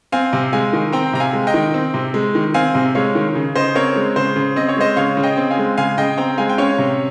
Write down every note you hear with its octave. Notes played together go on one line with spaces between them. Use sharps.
C4 F5 G#5
C3
G#3 F5 G#5
D#3
C4 G5 A#5
C3 A#5
F5 G#5
G#3
D#5 G5
D#3
C4
C3
G#3
D#3
C4 F5 G#5
C3
G#3 C#5 F5
D#3
C#3
C#3 C5 D#5
C4 A#4 C#5
G#3
C#3 C5
C#3
C4 D#5
C#5
G#3 C5 D#5
C#3 C#5 F5
C#3
D#5 G5
C4
F5 G#5
G#3
C#3 F5 G#5
C#3 D#5 G5
C4 G5 A#5
G#3 F5 G#5
G5
C#4 C#5 F5
C3